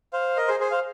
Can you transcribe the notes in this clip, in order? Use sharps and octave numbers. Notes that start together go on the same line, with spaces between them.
C5 F5
A#4 D#5
G#4 C5
G#4 C5
C5 F5